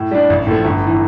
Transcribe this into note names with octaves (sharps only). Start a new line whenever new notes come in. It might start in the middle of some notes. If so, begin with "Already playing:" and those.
Already playing: A2
G3 D4
A1
A2 F3 A3
G1
E3